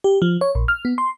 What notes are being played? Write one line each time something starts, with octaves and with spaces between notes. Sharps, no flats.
G4
F3
C#5
A#1
F6
B3
C6